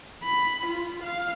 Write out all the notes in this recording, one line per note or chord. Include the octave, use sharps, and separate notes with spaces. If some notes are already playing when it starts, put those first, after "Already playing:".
B5
F4
F5